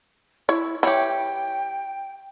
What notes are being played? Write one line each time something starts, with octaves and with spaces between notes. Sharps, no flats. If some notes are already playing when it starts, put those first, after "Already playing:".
E4 C#5
E3 E4 G4 C#5 G5